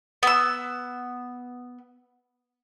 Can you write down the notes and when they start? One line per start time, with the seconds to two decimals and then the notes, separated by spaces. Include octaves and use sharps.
0.23 B3 E6